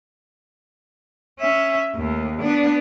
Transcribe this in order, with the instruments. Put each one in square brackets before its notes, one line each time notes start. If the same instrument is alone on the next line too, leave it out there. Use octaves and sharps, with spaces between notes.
[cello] C#4 E5
D#2 A3
B3 D4